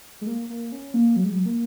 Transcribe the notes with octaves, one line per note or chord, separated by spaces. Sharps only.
G#3
A#3
A#3
C#4
A#3
F#3
G#3
F#3
A#3